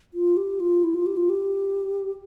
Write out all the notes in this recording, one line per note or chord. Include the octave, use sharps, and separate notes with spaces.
F4
G4
F4
E4
F4
G4
F4
G4